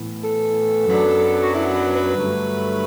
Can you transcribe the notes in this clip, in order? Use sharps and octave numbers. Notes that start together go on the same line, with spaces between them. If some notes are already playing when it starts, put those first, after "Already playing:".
Already playing: A2 E3 B3
A4
F#2 F#3 B3 D4
F#4
E4
B4
B4
G2 D3 F#3 A3